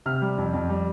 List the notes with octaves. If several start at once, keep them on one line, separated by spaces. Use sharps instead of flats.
C3 F6
G3
F2
F2
G3